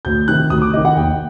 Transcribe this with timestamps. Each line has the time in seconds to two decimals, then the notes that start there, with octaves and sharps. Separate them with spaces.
0.05 D2 G6
0.28 C3 D#3 F#6
0.50 D2 D#6
0.62 D6
0.74 C3 D#3 D#5
0.85 F#5
0.96 D#2 G5